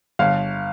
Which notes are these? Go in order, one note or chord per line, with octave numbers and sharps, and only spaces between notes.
G1 F5